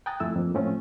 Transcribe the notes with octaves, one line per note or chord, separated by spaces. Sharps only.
G5 G#5 A#5 D#6 F#6 A6
F2 A3 E4 E6
F2 A#3
A2 F3 A3 C4 C#4 F4